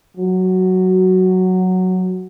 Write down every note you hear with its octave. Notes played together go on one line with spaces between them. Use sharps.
F#3